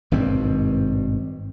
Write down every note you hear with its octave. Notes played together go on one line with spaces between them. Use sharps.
G#1 G2 B2 C4